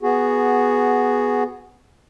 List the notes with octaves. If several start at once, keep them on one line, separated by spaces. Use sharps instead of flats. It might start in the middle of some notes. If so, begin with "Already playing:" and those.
B3 F#4 G#4